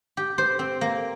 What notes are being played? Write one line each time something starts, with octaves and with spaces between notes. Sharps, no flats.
G4
C5
C4
A#3